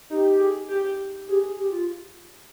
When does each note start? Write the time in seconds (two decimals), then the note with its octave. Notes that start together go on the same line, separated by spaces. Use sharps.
0.10 D#4 G4
0.39 G#4
0.69 G4
1.28 G4 G#4
1.57 G4
1.70 F4